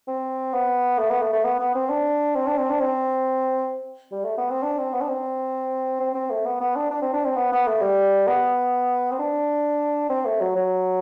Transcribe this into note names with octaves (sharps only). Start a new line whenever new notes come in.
C4
B3
A3
B3
A3
A3
B3
B3
C4
D4
C4
D4
C4
D4
C4
G3
A3
B3
C4
D4
C4
B3
D4
C4
C4
C4
A3
B3
B3
D4
D4
C4
D4
C4
B3
B3
A3
G3
B3
C4
D4
C4
A3
F#3
F#3